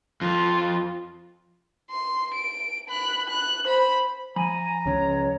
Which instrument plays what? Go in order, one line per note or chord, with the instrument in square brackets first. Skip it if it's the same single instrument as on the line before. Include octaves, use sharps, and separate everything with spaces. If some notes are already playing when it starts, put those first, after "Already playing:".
[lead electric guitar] F2 [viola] F4
[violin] C6
D7
B5 F#6
F#6
C5 B5
[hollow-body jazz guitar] F3 B5 [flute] G#5 [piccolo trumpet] A#5
[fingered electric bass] C#2 C#3 [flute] C#5